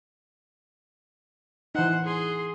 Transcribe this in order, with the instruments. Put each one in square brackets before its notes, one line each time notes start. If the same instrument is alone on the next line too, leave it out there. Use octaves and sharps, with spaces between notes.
[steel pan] E3 D#4 [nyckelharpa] C5 F#5
[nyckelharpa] G#4 C6